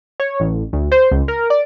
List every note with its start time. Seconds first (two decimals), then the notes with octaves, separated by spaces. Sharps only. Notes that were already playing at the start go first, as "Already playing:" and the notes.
0.20 C#5
0.40 A1
0.73 D2
0.92 C5
1.11 C#2
1.28 A#4
1.50 D5